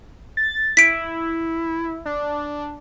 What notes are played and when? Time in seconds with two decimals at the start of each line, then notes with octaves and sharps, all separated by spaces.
0.37 A6
0.77 E4 B6 D7
2.06 D4